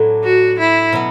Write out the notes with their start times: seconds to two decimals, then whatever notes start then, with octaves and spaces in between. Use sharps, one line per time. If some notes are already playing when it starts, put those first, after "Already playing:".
Already playing: A2 F#3 A3 D4
0.24 F#4
0.59 E4
0.92 B2 F#3 B3